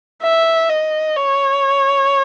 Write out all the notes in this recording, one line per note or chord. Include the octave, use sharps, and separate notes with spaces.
E5
D#5
C#5